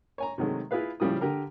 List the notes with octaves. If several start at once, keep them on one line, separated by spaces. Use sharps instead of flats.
C#5 G#5 A#5
C3 D#3 F#3 G#3 A3
E4 F4 G#4 B4 F5
A2 C#3 F3 G3 E4 D#6
D3 G4 A#4